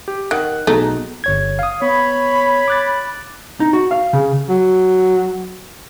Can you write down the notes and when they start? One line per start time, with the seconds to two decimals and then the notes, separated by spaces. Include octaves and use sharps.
0.08 G4
0.31 D#3 F#5 F#6
0.67 B1 A3 G#4 A#5
1.24 G1 C#5 G#6
1.59 F5 D#6
1.82 B3 C#5 B5
2.68 D6 F#6 A6
3.60 D#4
3.73 F#4
3.91 F5
4.13 C#3
4.49 F#3